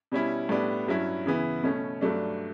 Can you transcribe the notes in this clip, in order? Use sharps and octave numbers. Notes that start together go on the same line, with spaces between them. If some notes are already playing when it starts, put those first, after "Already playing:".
B2 G3 C#4 E4
A2 G3 B3 D4
G2 F#3 C#4 E4
C#3 E3 B3 E4
B2 A3 C#4
G2 F#3 A3 D4